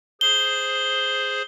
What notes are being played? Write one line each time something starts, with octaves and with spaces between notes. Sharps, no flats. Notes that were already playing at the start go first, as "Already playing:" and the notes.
G#4 C5 G7